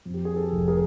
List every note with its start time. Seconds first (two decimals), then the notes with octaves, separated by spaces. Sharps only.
0.05 F2
0.14 G4
0.25 G#4
0.36 G4 A4
0.52 F1
0.68 G#4 A#4